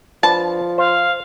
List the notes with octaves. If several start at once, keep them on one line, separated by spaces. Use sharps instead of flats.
F3 D4 B4 A5
C5 F5